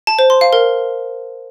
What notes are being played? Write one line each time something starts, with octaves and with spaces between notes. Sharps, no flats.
A5
C5
C6
F5
A#4